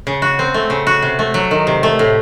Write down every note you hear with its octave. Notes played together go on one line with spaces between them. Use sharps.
C#3
F#4
C4
A3
C#3
F#4
C3
A3
F#3
D#3
C3
A3
A2